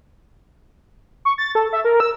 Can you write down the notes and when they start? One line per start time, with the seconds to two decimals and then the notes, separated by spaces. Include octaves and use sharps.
1.25 C#6
1.38 A6
1.55 A4
1.73 E5
1.85 A#4
2.00 E6